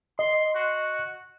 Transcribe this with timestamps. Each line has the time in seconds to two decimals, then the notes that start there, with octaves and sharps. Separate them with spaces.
0.19 D#5 C6
0.55 F#4